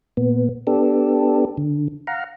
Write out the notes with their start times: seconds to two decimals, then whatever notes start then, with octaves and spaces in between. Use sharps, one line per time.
0.17 A#2 B3
0.67 B3 D4 G4 A4
1.57 D3
2.07 F5 F#5 A#5